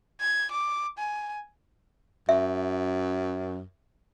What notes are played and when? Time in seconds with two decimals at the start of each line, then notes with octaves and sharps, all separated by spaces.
0.21 G#6
0.51 D6
0.98 G#5
2.29 F#2 E5